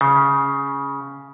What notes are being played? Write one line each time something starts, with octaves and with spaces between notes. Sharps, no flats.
C#3